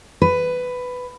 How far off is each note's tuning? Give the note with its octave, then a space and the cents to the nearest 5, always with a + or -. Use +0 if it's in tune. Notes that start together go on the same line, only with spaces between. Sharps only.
B4 +10